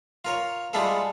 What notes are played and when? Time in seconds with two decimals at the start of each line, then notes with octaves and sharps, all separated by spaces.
0.25 F4 A#4 C#5
0.73 G3 G#3 E4 F4 G#4 A4